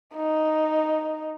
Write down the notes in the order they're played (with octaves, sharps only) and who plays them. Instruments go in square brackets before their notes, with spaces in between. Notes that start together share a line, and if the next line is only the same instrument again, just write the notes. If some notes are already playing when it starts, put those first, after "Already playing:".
[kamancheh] D#4